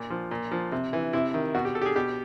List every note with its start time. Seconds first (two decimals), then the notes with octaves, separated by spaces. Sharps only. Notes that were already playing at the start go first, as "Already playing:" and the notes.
Already playing: A#2
0.10 F3
0.31 A#2
0.52 F3
0.72 C3
0.93 E3
1.13 C3 E4
1.34 D#3
1.54 B2 F#4
1.65 G4
1.75 A4
1.81 G4
1.86 G#4
1.95 B2 G4